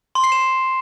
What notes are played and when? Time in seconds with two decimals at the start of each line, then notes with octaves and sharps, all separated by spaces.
0.15 C6
0.24 C7
0.32 E7